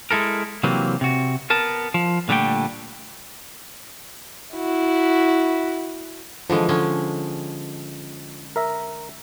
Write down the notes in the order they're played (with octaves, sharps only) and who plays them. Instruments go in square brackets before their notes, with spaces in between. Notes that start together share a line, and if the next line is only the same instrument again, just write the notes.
[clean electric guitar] G#3 E4 A4 A#4
C3 E3 F#3 A#3 C4
C3 F#4
B3 A#4 A5
F3
A#2 D3 G3 A3 G5
[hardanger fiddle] E4 F#4
[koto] D3 E3 G#3 [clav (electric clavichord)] F3
[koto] D3 G#3 C#4
[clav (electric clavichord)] A#4 E5 A#5